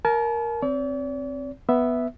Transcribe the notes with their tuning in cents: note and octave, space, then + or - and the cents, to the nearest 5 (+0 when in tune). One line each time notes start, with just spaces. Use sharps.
A#4 +0 A5 -40
C4 +5 D5 -45
B3 +0 E5 +0